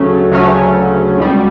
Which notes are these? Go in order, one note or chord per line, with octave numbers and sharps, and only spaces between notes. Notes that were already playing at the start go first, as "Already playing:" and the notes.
Already playing: D2 C#3 F#3 A3 C#4
D2 C#3 F#3 A3 C#4
C#2 B2 G3